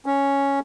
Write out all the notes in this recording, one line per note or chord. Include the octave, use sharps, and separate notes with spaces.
C#4